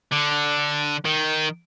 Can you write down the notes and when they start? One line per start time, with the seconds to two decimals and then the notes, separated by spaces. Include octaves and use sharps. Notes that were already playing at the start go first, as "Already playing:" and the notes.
0.12 D3
1.05 D#3